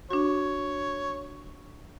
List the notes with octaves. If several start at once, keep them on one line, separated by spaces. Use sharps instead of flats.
D4 F#4 C#5